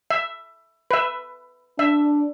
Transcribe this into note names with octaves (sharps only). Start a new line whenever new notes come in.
E5
B4 E5
D4 E5